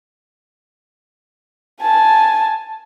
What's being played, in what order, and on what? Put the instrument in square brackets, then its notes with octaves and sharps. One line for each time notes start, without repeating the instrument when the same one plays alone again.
[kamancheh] G#5 A5